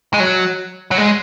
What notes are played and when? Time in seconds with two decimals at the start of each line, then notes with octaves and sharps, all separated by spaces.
0.14 G#3
0.20 F#3
0.91 F#3
0.98 G#3